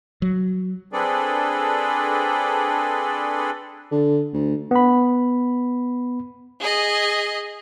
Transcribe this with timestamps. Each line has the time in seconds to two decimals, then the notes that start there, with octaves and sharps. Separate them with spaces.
0.22 F#3
0.93 C4 D4 G#4 A4 B4 D5
3.91 D3
4.33 D2
4.71 B3 B5
6.61 G#4 D#5